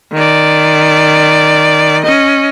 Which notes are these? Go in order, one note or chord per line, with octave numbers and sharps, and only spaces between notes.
D#3 D5
C#4 D#5